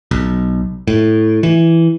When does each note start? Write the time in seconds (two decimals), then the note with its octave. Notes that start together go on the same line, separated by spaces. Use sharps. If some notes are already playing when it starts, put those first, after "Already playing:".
0.11 B1
0.88 A2
1.43 E3